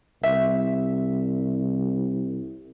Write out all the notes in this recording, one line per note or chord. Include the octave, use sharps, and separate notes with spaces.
C2 E5